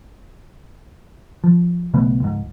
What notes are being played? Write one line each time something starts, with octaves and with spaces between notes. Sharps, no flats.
F3
B1 C#3 A3 B3
C#2 G#2